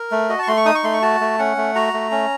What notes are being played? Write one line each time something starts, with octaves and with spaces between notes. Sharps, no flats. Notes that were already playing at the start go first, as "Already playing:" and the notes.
Already playing: A#4
A3
F#4 D#5
A5 C#6
A3 C6
C#6
D#4 D#6
C#6
A3 C6
C#6
F#4 A5
A3
C#4 F#5
A3
F#4 A#5
A3
C#4